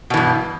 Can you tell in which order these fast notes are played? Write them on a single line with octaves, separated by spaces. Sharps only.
B2 E3 G2